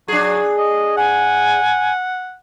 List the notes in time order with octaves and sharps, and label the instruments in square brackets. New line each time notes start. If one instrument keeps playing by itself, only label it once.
[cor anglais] F#3 [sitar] D4 G#4
[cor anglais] D#5
[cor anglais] F#5 [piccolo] G#5